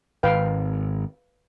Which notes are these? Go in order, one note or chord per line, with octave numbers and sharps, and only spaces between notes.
G#1 B4 F5 G5